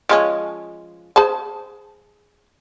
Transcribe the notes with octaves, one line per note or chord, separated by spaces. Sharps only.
F3 G#3 C#4
G#4 C5 A5